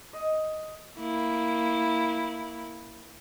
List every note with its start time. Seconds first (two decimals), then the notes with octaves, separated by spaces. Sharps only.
0.13 D#5
0.99 A#3 E4